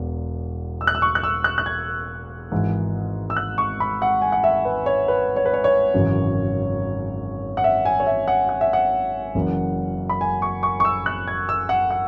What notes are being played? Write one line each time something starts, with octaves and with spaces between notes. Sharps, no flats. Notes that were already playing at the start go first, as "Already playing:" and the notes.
Already playing: E1 E2
E6
F#6
E6
C#6
F#6
E6
F#6
F#6
G#6
G#1 G#2 E3
E6
F#6
C#6
B5
F#5
G#5
F#5
E5
B4
C#5
B4
C#5
B4
C#5
C#5
G#1 F#2 C#3 E3
F#5
E5
G#5
C#5
E5
F#5
F#5
E5
F#5
F#1 F#2 E3
B5
G#5
C#6
C#6
C#6
E6
F#6
G#6
E6
F#5
F#5